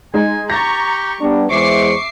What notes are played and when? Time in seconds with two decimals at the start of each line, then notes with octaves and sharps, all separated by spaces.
0.14 G#3 D#4 G#5
0.50 G4 A#5 C#6 A6 A#6
1.21 G3 B3 D4
1.50 E2 G#3 C5 E5 C#6 D6 C7